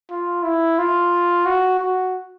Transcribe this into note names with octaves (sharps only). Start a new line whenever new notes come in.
F4
E4
F4
F#4
F#4